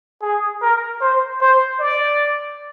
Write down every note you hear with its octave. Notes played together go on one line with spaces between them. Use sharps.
G#4
A#4
C5
C5
D5